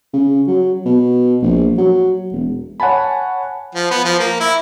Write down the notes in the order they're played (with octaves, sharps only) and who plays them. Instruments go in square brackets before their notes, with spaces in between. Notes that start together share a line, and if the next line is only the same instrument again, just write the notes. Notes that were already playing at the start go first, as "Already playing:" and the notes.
[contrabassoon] C#3
F#3
B2
A#1
F#3
E1
[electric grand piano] C#5 F#5 G#5 A5 B5
[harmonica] F3
B3
F3
A#3
E4